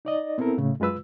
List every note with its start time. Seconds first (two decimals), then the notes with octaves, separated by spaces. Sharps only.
0.05 D#4 D5 D#5
0.38 B3 C4 E4 A4 A#4
0.58 A2 C#3 A3
0.80 F#2 G#3 F4 B4 E6